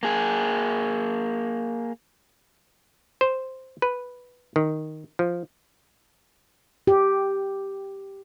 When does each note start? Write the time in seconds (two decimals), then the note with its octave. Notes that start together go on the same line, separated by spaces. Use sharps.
0.03 A#3 G#4
3.21 C5
3.82 B4
4.56 D#3
5.19 F3
6.87 G4